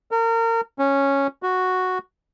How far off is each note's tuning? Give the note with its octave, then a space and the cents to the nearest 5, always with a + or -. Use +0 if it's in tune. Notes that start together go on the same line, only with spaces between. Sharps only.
A#4 -30
C#4 -5
F#4 -5